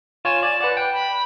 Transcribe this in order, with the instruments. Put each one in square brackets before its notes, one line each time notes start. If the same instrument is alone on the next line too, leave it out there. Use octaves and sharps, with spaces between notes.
[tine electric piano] F4 C#5 G#5 [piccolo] E7
[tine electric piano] D5 G#5
[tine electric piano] B4 D5 [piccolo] F#5
[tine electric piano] G5 [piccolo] F#6
[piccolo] B5